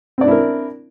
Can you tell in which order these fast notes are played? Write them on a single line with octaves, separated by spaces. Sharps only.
C4 D5 D4 E4 A#4